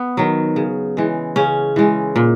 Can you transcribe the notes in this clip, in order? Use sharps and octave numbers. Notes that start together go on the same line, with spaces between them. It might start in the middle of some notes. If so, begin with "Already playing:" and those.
Already playing: B3
D#3 F#3
C#3
E3 G#3
C#3 C#4
E3 G#3
A#2